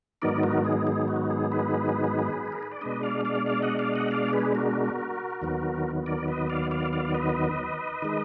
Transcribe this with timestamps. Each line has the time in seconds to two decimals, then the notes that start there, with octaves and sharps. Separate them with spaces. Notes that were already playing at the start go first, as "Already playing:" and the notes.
0.22 G#2 D#3 F#3 B3 D#4 A#4 D5
0.43 F#4 A#4
0.65 G#4
0.87 G#4
1.08 F#4
1.30 G#4
1.51 G#4 B4
2.52 A#4
2.63 B4
2.71 D5
2.81 B2 G#3 D4 B4 D#5
3.03 D5 F5
3.25 D5 F5
3.46 D5 F5
3.62 D#5 F#5
3.79 D5 F5
3.95 D#5 F#5
4.11 D5 F5
4.33 G#4 B4
4.55 F#4 A#4
5.41 D#2 D#3 F#3 B3
6.06 A#4 D5
6.28 B4 D#5
6.50 D5 F5
6.71 D5 F5
6.93 D5 F5
7.05 D5
7.14 B4 D#5
8.02 D#3 G#3 D#4